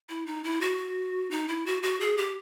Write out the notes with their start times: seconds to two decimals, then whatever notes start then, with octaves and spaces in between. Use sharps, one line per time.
0.09 E4
0.26 D#4
0.44 E4
0.61 F#4
1.31 D#4
1.48 E4
1.66 F#4
1.83 F#4
2.00 G#4
2.17 G4